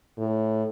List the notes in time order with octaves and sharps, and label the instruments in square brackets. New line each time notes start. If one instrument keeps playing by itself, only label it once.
[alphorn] A2